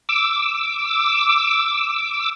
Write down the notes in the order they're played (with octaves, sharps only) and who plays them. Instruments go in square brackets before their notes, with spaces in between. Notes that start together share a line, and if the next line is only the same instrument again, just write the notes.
[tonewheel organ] D6 E6